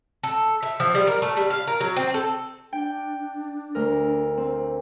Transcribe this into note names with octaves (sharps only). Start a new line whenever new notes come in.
A4
E5
F3
G3
A#4
A3
G3
F5
A#4
F#3
C4
A4
D4 G5
D2 A#4
C4